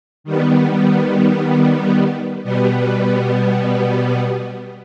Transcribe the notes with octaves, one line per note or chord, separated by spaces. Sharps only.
D#3 G3 B3
B2 G3 B3